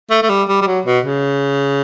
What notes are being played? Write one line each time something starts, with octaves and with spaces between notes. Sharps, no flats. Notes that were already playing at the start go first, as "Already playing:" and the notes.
A3
A3
G3
G3
G3
F#3
B2
C#3